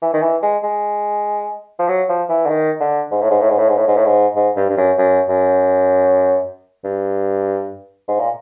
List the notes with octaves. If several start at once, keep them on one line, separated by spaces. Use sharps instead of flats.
E3
D#3
E3
G#3
G#3
F3
F#3
F3
E3
D3
D#3
D3
G#2
A2
G#2
A2
G#2
A2
G#2
A2
G#2
A2
G#2
G#2
G2
G2
F#2
F#2
F#2
G2
G#2
A#2